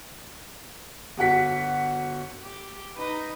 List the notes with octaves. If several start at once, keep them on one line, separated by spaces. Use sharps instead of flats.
G1 F#4 F#5 B6
G4
D#4 B4